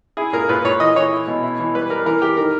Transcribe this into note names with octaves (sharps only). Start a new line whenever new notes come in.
E4 G#4
A#2 A#4
A#2 B4
A#2 C#5
E3 D#5
E3 C#5
E4
B2
E4
E3
G3 B4
G3 A#4
E3 A#4
E3 G4
D#3 A#4